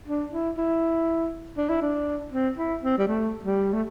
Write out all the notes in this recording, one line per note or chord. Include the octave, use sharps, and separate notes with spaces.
D4
E4
E4
D4
E4
D4
C4
E4
C4
G3
A3
G3
A3